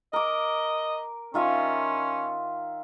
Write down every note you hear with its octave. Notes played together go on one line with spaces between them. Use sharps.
A#4 D#5 D6
D#3 C#4 F4 E5